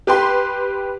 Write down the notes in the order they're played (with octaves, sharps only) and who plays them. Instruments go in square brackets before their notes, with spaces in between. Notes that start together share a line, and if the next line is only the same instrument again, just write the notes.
[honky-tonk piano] G4 B4 G5 C6